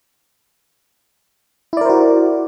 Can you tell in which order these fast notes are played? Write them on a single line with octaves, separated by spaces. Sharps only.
E4 D5 A#4 C5 F#4